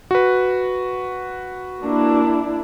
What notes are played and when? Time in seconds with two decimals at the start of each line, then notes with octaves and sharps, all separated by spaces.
0.11 F#4 B4
1.82 A#3 D4 E4